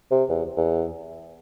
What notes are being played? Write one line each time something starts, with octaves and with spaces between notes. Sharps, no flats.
C3
E2
E2